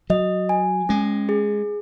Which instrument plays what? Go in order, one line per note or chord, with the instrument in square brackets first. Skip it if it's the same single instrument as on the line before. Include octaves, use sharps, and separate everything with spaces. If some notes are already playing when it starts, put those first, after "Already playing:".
[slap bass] F#3 [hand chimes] D#5
[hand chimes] G#5
[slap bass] G#3 [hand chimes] C#4
[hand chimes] G#4